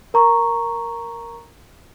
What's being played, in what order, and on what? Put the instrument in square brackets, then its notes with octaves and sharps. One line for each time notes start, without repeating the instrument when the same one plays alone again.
[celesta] A#4 A#5 C#6